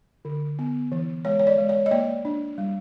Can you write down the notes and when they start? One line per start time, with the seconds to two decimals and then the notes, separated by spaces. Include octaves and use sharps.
0.25 D3
0.59 B3
0.92 E3
1.25 G#3 C#5
1.39 C#5
1.47 D5
1.58 G#3
1.69 C#5
1.86 D#5
1.91 A#3 D5
2.25 D4
2.58 G3